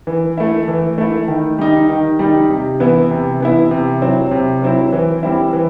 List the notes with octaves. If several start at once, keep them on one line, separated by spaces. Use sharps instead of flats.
E3
A3 E4
E3
A3 E4
D#3
G3 D#4
D#3
G3 D#4
C3
E3 B3 E4
C3
E3 B3 E4
C3
F#3 C4 E4
C3
F#3 C4 E4
E3
G3 C4 E4
E3